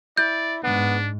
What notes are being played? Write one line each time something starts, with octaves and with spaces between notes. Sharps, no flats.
E4 D5 G6
G#2 B3 D4